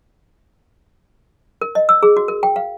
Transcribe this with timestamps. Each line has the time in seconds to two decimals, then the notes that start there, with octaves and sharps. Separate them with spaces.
1.61 A#4
1.75 D#5
1.89 E6
2.03 G#4
2.17 F#4
2.28 A#4
2.43 G5
2.56 F5